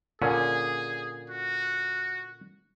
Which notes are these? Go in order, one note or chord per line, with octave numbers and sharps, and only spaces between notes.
A#2 D3 C#4 G#4
F#4